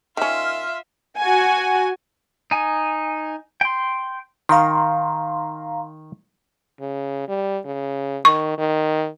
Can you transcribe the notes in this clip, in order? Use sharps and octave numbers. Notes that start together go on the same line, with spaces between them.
D#3 C#4 F4 E5 C6 F6
F#4 G#5
D#4 G#5
G5 C6
D#3 F5 A#5 C6
C#3
G3
C#3
D#3 C#6
D#3